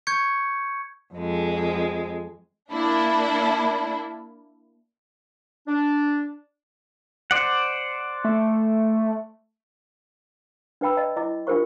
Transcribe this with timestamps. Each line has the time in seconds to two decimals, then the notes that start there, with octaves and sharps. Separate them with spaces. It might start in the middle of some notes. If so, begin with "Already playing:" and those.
0.07 C#6 G6 G#6 C#7
1.14 F2 G#3
2.72 A#3 D4 E4
5.67 D4
7.31 C5 D5 F#5
8.24 A3
10.81 D4 B4 G5 B5 E6
10.97 D5 D#5 A5
11.17 E4 D#5 D6
11.47 D4 F4 G4 A#4 C5 C#6